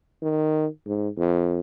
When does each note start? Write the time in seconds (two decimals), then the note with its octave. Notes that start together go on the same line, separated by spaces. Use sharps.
0.22 D#3
0.86 G#2
1.18 F2